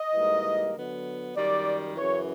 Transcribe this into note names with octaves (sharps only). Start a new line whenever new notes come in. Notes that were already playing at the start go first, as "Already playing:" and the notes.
Already playing: D#5
G#2 E3 G3 A#3
D3 F#3 B3
F#2 D#3 G3 D5
F#2 C#3 E3 C#5